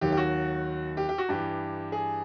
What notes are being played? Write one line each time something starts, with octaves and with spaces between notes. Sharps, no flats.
D#2 D#3 F#3 G4
G4
F#4
G4
G4
F#4
G2 E3 G4
G#4